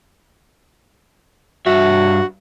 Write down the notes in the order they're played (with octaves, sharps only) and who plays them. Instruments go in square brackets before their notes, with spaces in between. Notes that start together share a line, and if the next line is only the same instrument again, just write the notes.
[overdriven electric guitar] G2 E5 [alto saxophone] F#4